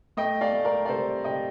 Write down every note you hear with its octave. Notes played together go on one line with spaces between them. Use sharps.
A3 D#5 G5
D5 F5
A3
A#4 D5
D5
C3 A4 C5
C3 D#5 G5